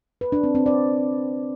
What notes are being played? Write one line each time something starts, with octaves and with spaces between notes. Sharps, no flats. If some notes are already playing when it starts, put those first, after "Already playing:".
B4
D4
C4
C4
D5